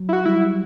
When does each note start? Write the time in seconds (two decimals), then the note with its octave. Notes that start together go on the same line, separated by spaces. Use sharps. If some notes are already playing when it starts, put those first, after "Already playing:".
Already playing: F#3
0.09 E4
0.13 F#4
0.25 G3 E4